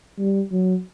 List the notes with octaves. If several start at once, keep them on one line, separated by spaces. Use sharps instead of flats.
G3
F#3